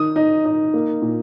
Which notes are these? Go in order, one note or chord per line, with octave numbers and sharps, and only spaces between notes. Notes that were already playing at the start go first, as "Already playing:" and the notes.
Already playing: D#3 D#6
D#4
D#4
A#3
A#2